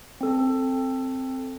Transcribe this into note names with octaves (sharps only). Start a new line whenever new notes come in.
C4 A4